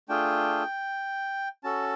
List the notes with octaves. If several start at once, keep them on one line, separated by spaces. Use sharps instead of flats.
A3 D4 F4 G#4 G5
C#4 F#4 A4 A5